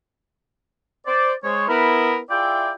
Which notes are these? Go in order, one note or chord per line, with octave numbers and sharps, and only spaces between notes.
C5 D5
G#3 C5 C#5
B3 E4 A#4 B4
E4 F4 G#4 D5 E5 G5